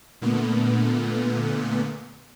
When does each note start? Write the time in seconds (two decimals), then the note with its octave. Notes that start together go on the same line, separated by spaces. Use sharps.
0.21 A#2 D3 A3 B3